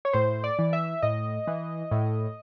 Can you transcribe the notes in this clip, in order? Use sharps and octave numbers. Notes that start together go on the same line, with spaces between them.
C#5
A2 C5
D5
E3
E5
A2 D#5
E3
A2